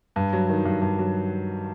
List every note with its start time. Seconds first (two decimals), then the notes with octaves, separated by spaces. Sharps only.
0.16 G2
0.33 F#3
0.49 D#3
0.65 G2
0.82 G2
0.99 F#3